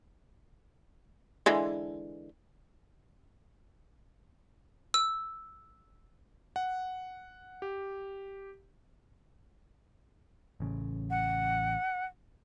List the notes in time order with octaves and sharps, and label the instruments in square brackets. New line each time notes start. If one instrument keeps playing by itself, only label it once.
[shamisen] D3 E3 G#3
[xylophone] E6
[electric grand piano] F#5
G4
[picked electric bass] A1 C#3
[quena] F#5